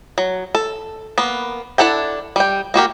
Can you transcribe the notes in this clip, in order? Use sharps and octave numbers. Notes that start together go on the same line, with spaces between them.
F#3
A4
A#3 B3
D4 E4 A4 F#5 G5
G3 G5
A#3 F#4 G4 A#4